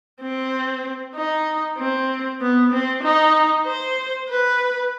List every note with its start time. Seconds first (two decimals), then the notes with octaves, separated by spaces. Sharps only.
0.21 C4
1.15 D#4
1.78 C4
2.41 B3
2.72 C4
3.03 D#4
3.66 C5
4.30 B4